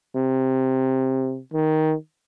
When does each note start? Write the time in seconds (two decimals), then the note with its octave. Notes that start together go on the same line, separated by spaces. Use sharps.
0.16 C3
1.53 D#3